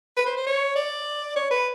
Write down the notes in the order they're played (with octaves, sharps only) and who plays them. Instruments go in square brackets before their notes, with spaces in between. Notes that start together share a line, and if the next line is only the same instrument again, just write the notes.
[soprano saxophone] B4
C5
C5
C#5
D5
C#5
B4